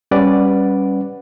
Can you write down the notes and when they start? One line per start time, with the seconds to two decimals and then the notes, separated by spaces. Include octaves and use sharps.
0.11 G3 C#4 B4 D5 F#5